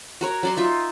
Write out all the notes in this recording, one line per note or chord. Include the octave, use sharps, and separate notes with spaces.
F#4 A#4 C#5
F#3 D5 C6
D#4 F4 E5